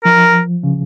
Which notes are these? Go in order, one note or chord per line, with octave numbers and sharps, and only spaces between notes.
F3 A#4
C#3